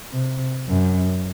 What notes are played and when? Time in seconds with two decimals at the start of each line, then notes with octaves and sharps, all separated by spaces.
0.12 C3
0.68 F#2